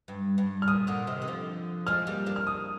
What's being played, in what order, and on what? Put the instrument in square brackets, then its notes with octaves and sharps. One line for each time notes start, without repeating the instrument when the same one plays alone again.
[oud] G2
G2
[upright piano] F6
[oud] A#2 [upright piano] D#6
[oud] A#2 D3
C3 D#3
D#3
D3 F3
[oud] F3 G#3 [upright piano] F6
[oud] G3 A#3
A#3 D4
[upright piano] F6
D#6